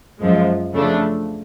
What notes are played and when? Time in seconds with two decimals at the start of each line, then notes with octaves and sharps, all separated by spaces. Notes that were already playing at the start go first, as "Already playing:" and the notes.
0.20 F#2 F3 G#3
0.72 C#3 F3 A3 D4